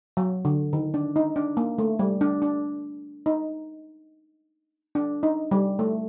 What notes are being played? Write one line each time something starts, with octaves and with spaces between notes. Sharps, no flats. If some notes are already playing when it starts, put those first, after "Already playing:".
F#3
D3
D#3
D4
D#4
D4
A#3
A3
G3
D4
D4
D#4
D4
D#4
G3
A3